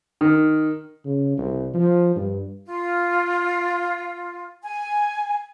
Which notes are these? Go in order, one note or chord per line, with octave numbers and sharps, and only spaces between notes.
D#3
C#3
C2
F3
G2
F4
G#5